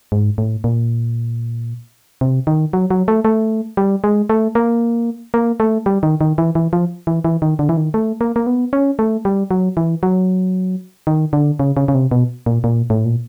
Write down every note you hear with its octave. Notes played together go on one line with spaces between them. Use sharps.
G#2
A2
A#2
C3
D#3
F#3
F#3
A3
A3
G3
G#3
A3
A#3
A#3
A3
G3
D#3
D#3
E3
E3
F3
E3
E3
D#3
D3
E3
D#3
A3
A#3
A#3
B3
C#4
A3
G3
F#3
E3
F#3
D#3
D3
C#3
C#3
C#3
C3
B2
A#2
A#2
A2
A#2